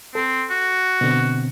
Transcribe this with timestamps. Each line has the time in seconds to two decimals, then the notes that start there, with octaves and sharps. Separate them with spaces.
0.15 C4 A4
0.51 F#4
1.01 B2 D3 C4